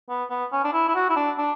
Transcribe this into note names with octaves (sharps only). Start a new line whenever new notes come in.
B3
B3
C#4
D4
E4
E4
F#4
E4
D4
D4